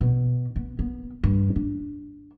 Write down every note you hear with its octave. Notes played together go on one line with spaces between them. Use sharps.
B2
B3
B3
G2
D4